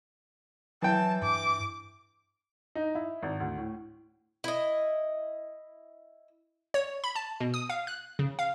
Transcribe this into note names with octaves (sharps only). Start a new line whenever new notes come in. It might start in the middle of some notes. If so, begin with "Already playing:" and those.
E3 F#3 G5 A5
G2 D6
D#4
E4
G#1
D2
A2
E4 D#5
C#5
B5
A5
B2
D#6
F5
F#6
C#3
F5